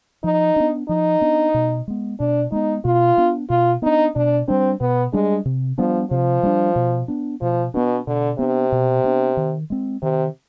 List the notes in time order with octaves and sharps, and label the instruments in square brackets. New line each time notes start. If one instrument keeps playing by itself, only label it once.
[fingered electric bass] F3 [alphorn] D#4
[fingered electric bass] B3 D4
[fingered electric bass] F3 [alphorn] D#4
[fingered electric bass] B3 D4
B2
G#3 B3
[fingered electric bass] B2 [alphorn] D4
[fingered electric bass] G#3 B3 [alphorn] D#4
[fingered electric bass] B2 [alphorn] F4
[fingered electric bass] B3 D4
[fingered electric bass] B2 [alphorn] F4
[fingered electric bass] B3 D4 [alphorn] D#4
[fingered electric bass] B2 [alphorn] D4
[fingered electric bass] G3 D4 [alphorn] C4
[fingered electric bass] B2 [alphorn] B3
[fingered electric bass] G3 D4 [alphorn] G#3
[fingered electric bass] C3
[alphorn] F3 [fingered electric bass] G3 B3 D4
[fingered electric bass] C3 [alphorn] F3
[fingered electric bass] G3 B3 D4
B2
B3 D4
[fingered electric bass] B2 [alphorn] F3
[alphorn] B2 [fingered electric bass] B3 D4
[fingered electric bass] B2 [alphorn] D3
[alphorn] C3 [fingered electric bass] B3 D4
[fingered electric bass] B2
B3 D4
D#3
G#3 C4
[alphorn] C3 [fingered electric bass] D#3